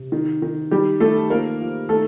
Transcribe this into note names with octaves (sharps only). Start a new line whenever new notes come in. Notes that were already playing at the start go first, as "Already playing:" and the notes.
Already playing: C3
D#3
D#3
D#3 G3 G4
D#3 A3 A4
F3 A#3 A#4
F3
D#3 A3 A4